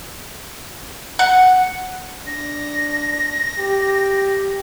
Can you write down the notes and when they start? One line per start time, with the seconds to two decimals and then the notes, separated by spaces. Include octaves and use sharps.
1.19 F#5
2.26 D4 A#6
3.59 G4